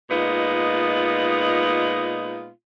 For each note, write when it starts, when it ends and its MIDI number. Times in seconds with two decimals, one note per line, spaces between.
0.09 2.48 46
0.09 2.48 56
0.09 2.48 59
0.09 2.48 63
0.09 2.48 65